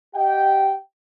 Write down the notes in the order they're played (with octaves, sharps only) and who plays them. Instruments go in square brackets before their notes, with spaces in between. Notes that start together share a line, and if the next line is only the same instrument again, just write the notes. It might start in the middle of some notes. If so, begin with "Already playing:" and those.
[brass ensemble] G4 D#5 F#5 G5